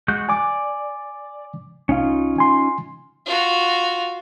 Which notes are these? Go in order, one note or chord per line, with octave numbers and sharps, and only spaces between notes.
G#3 F#4 G6
D5 G#5 D6
C2 C#4 D#4 F4 F5
G#5 C6
F4 F#4